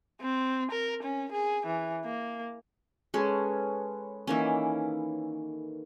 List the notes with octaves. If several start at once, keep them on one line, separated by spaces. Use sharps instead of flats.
C4
A#4
C#4
G#4
E3
A#3
G#3 C#4 A4 B4 C#5
D#3 E3 A#3 C#4